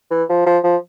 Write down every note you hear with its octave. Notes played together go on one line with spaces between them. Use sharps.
E3
F3
F3
F3